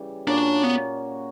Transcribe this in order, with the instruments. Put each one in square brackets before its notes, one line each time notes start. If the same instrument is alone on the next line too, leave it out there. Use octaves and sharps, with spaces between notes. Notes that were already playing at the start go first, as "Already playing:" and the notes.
Already playing: [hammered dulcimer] C#3 E3 G3
[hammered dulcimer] A#2 A#3 C#4 F#4 [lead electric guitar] D4
[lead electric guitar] B3